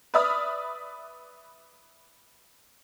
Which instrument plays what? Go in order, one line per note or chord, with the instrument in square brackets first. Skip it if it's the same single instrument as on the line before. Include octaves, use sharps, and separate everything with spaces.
[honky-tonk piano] B4 D5 E5 B5 D#6 F6